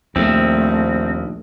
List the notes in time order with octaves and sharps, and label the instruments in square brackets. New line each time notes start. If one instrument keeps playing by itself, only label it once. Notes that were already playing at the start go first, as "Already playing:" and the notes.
[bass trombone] A#1 [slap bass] D#2 [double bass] A3 [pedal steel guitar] C4